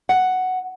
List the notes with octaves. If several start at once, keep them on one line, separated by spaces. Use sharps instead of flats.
F#5